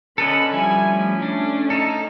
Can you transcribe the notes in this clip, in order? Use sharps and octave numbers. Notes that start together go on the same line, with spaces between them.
D3 C#4 A4 B4 D#5 B5
F3 G3 E4 G#5
A3 C#4
D4
D#4 A4